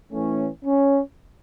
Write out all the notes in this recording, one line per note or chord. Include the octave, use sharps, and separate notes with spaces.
A2 E3 A3 C#4
C#4